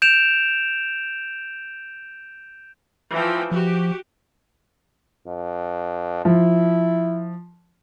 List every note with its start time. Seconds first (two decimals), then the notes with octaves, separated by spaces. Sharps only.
0.02 G6 D7 E7 F7
3.12 E3 F3 G5
3.51 F3 F#4 G4
5.27 F2
6.25 F3 E4